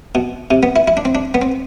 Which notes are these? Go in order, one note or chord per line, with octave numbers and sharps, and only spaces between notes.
B2
C3
B3
E4
E4
D4
C4
D4
B3
C4